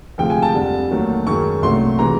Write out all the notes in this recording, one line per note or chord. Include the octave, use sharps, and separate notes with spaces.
D2 C3 F3 G#3 G5
G#5
A5
F2 D3 G3
D#2 D#3 F#3 A3
F#2 D#3 G#3 C#6
C2 A#2 F#3 A3 C6
C3 E3 G#3 A#5